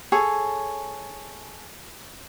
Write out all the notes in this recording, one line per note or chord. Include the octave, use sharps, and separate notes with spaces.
G#4 A4 C#5